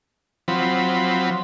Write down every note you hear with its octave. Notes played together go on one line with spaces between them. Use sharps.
F3 F#3 C4 B5